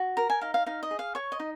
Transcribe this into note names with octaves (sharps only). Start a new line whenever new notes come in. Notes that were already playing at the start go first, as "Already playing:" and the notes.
Already playing: F#4
A#4 A#5
G#5
D#4 F5
F5
D#4 F5
D#5
G#4
F5
C#5 C#6
D#5
D#4